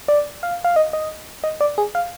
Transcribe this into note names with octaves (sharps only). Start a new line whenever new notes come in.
D5
F5
F5
D#5
D#5
D#5
D5
G#4
F5